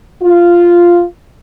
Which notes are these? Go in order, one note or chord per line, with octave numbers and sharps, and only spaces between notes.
F4